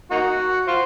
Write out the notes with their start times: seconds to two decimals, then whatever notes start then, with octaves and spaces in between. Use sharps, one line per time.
0.11 A#3 D#4 F#4
0.68 F4 C5